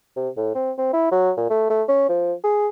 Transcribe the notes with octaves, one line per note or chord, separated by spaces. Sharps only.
C3
A2
C4
C4
E4
F#3
A#2
A3
A3
C#4
F3
G#4